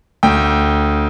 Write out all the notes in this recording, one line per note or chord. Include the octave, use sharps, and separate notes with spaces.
D2 G5